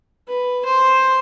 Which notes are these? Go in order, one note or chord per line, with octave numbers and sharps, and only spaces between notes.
B4
C5